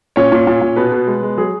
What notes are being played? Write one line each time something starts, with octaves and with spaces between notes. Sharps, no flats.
A#2 C#4 C#5
A#2
A#2
A#2
B2 B3 B4
B2
G#3
G#3
F#3 G#4